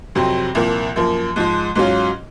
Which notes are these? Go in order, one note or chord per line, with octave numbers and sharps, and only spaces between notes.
F2 C3 F#3 C4
C2 A#2 F3 A#3
F#2 F3 A#3
G#2 F3 G#3
G#2 F#3 C#4 F4